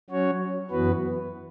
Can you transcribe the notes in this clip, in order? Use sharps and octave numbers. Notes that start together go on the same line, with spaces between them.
F#3 C#4 F#4 C#5
F#2 E3 B3 F#4 B4